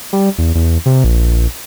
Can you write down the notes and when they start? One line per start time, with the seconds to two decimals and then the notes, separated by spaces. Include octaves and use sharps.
0.13 G3
0.38 E2
0.55 E2
0.86 C3
1.04 A#1